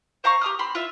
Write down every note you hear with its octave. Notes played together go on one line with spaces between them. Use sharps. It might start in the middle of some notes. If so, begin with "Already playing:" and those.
C5 F5 A#5 C#6
G4 A#5 D#6 F6
C4 B5 C6
F4 E5